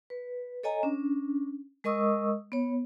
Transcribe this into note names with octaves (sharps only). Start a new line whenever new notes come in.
B4
A4 C#5 D#5 G#5 A#5
C#4 D4
G#3 A#4 D#5 C#6 D#6 E6
B3 C#5